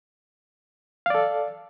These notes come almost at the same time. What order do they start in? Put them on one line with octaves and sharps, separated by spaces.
F5 D5 A4